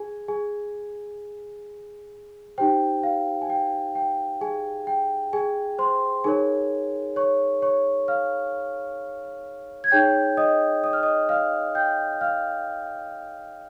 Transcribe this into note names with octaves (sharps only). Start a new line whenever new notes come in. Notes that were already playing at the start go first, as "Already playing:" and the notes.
Already playing: G#4 G#5
G#4 G#5
D#4 G4 C5 G5
F5
G#5
G5
G5
G#4 G#5
G5
G#4 G#5
C5 C6
D#4 G#4 A#4 C#5 G#5
C#5 C#6
C#5 C#6
F5 F6
G#6
D#4 G#4 C#5 G5 G6
D#5 D#6
D#6
F6
D#5 D#6
F5 F6
G5 G6
F5 F6